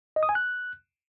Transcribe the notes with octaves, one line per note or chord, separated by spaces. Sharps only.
D#5
D#6
G#5
F#6